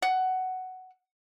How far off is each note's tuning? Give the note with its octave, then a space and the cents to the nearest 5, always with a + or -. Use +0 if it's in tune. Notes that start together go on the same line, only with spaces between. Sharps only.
F#5 +10